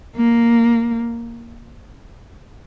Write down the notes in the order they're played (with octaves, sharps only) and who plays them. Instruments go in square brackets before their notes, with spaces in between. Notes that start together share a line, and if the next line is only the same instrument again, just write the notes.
[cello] A#3